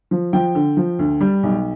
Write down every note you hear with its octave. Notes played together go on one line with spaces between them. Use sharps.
F3
F3 G5
D3
F3
D2
G3
B1